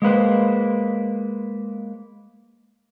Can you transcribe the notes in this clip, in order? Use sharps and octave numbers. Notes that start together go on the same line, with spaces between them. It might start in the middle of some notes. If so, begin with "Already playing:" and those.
G#3 A#3 B4 C5